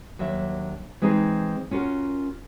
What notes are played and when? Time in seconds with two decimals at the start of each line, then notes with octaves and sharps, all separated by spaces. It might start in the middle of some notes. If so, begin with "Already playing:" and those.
0.19 D#2 F#3 D4 E5
1.02 E3 G#3 C4 D#4 G#4
1.71 C#4 F4 F#4 A#4